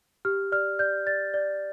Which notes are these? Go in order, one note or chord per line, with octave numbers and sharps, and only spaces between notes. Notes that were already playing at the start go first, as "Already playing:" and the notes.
G4 F6
D5 F6
D5 G6
D5 A6
D5